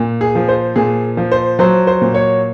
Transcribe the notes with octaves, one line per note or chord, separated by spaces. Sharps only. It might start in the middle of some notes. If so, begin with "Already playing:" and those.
Already playing: A#2
G#4
F3
C5
A#2 G#4
F3
C5
F#3 C5
C5
A#2
C#5